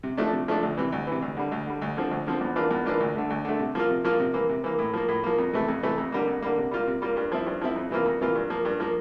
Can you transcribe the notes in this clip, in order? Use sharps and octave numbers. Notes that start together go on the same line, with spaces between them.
C3
F3 A3 D4
C3
F3 A3 D4
D2
C3 E3
D2
C3 E3
D2
D3 G3
D2
D3 G3
D2
D3 F3 C4
D2
D3 F3 C4
E2
E3 A#3 D4 F4
E2
E3 A#3 D4 F4
D2
D3 A3
D2
D3 A3
C3
F3 A#3 F4
C3
F3 A#3 F4
C3
E3 A#3
C3
E3 A#3
A2
F3 A#3
A2
F3 A#3
F2
C3 E3 A3
F2
C3 E3 A3
F2
D3 G3 A#3
F2
D3 G3 A#3
C3
G3 A#3 F4
C3
G3 A#3 F4
G2
F3 C4 E4
G2
F3 C4 E4
F2
C3 E3 A#3 F4
F2
C3 E3 A#3 F4
G2
F3 A#3
G2
F3 A#3